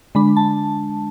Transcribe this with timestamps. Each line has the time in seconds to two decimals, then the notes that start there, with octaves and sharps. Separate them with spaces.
0.15 D3 G#3 D4 B5
0.37 A5